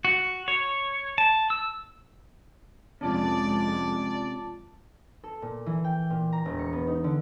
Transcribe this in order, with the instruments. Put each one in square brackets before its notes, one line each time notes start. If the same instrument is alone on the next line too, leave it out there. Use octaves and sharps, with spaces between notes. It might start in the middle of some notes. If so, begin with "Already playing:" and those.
[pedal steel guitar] F#4
C#5
A5
E6
[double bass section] F2 G#3 [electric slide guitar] C3 C#4 [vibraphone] F4 A5 [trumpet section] D5
[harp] A4
A#2
E3
G5
A#2
A#5
E1
C#7
B3
D#4
D3